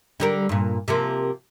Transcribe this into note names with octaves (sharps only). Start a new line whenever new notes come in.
D3 G3 A#4
G2 A#2
C3 F3 A#3